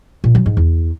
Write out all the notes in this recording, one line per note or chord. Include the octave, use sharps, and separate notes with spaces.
A#2
F#3
G#2
E2